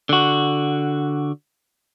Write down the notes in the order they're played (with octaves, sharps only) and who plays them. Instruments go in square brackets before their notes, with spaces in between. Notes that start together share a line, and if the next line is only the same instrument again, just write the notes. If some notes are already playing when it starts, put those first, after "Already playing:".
[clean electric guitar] D3 F#4